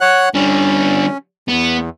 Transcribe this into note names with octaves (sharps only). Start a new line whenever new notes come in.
C#5 F#5 F#6
D3 G3 C#4
E2 B3